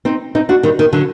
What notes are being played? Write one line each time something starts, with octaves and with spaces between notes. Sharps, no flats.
C4 D#4
C4 D#4
D4 F#4
D#3 G3
D#3
D3 F#3